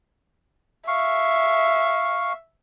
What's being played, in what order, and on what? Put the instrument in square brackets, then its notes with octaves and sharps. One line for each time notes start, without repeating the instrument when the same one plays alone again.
[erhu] E5 [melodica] F5 C#6